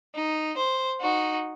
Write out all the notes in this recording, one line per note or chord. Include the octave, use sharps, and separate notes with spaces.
D#4
C5
D#4 F#4